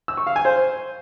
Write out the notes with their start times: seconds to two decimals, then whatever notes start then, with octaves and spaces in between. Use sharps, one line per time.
0.08 E6
0.17 C#6
0.27 F5
0.36 G#5
0.45 C5